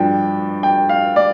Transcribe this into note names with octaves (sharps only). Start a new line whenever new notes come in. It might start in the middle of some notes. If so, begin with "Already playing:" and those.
Already playing: G2 F3 D4 G5
G5
F5
D5